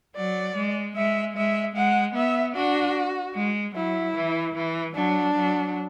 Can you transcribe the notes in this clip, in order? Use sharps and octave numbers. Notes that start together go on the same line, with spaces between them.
F#3 D5
G#3
G#3 E5
G#3 E5
G#3 F#5
B3 E5
D4 F#4
G#3
F#3 E4
E3
E3
F#3 D4
F#3